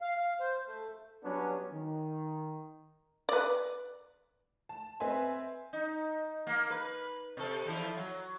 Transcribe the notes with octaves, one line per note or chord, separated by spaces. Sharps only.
F5
F5
C5
A3
F#3 G3 B3 C#4 D4
D#3
B4 D5
A5
C4 B4 E5 G#5 C6
D#4
A#3
B4
C3 A4
E2 F3 E4
F#3